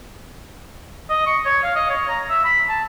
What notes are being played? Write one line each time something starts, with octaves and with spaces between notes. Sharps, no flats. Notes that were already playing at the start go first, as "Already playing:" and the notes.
D#5
C#6
C#5
F5
D#5
C#5
A#5
E5
B5
A5